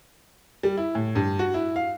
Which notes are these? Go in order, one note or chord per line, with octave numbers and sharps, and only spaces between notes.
G3
E4
A2
G2
F#4
E4
F5